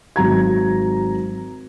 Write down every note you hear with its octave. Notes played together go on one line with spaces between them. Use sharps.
G#1 F#3 A#5 G#6